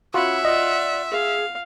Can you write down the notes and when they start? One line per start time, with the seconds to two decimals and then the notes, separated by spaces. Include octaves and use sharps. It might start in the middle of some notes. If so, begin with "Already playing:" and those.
0.14 C#4 F4 F#4 E5 F#5 B5
0.45 F4 D5 D#5 F#5
1.11 G#4 F5